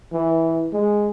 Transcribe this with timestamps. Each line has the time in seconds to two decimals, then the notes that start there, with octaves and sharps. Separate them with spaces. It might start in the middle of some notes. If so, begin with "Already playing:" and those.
0.13 E3
0.72 G#3